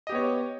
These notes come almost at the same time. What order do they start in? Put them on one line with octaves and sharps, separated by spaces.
D#5 G4 B3 C#5